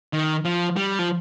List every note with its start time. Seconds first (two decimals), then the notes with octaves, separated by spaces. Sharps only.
0.13 D#3
0.45 F3
0.77 G3
0.99 F3